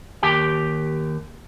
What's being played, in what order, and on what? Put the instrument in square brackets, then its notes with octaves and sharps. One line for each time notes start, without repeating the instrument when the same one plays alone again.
[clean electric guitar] D#2 G4 G5